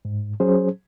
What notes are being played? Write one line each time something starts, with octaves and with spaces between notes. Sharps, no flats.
G#2
F#3 C#4 G#4 C5